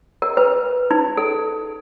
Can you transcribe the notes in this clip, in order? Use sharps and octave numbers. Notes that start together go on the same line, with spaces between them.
A#4
B4
D#4
A4